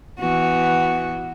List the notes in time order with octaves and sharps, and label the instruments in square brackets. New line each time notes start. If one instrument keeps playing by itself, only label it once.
[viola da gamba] E3 B3 F#4